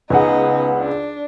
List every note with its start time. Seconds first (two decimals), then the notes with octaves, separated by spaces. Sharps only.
0.10 C#2 B3 D#4 G#4 F#5
0.78 D4